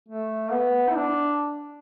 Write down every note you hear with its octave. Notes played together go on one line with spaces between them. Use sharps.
A3
B3
E4
D4